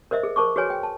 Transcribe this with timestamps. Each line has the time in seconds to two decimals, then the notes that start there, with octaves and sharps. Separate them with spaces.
0.11 A#4 C5 D#5 E5
0.23 G#4 A4
0.36 A#4 C5 A5 C#6 D6
0.56 F#4 G#4 B4 C#5 G#5
0.70 G5
0.83 A5